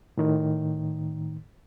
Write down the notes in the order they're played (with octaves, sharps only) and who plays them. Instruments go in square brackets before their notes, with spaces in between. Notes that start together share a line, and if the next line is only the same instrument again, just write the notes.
[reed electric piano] A2 D#3